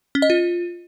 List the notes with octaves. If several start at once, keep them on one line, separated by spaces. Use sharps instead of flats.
C#4
D#5
F4